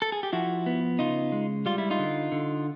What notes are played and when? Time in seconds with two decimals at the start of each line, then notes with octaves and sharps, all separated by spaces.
0.02 A4
0.12 G#4
0.23 G4
0.33 F3 E4 F#4
0.66 B3
0.99 C#3 D#4 F4
1.32 G#3
1.66 G3 F4
1.78 E4
1.90 D#4 F4
1.99 D3
2.32 D3